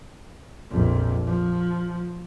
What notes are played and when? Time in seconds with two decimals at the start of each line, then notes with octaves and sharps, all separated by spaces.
0.71 A#1 F2
1.26 F3